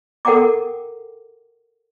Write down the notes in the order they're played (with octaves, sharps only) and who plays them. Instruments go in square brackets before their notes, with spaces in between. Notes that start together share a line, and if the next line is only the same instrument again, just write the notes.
[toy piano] A4 A#4 F#5 G5 A#5 D6